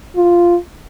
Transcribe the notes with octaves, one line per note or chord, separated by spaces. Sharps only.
F4